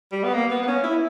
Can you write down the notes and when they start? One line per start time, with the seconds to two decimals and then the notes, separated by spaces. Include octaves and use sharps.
0.12 G3
0.24 B3
0.34 A#3
0.51 B3
0.63 B3
0.68 C#4
0.84 E4